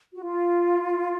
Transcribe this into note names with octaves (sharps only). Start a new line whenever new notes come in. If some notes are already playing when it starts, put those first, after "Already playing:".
F#4
F4